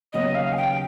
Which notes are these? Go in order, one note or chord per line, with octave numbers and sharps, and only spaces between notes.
D#2 C#3 F#3 B3 D#5
F5
G#5
G5